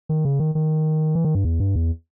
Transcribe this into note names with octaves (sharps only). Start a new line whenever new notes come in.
D#3
C#3
D#3
D#3
E3
D#3
G2
E2
G2
E2